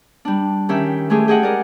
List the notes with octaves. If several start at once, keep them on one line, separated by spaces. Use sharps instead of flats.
G3 D4
D#3 C#4 G4 E5
G#3 A3 G4 G#4
G4 G#4 D#5 F#5
A#4 D5